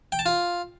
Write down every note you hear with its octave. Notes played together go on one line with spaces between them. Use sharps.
G5
A5
F4